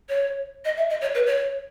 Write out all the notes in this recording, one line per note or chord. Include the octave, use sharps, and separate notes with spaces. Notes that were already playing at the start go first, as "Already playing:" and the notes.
C#5
D#5
E5
D#5
C#5
B4
C#5